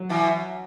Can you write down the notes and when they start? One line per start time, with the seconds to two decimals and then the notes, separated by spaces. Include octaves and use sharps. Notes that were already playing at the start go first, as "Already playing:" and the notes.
Already playing: F#3
0.09 B2 E3